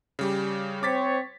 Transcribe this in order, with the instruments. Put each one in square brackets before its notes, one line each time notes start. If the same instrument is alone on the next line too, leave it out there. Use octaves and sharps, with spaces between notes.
[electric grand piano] C#3 G3 G4
[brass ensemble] C4 C5 C#5 [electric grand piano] D6 A6 B6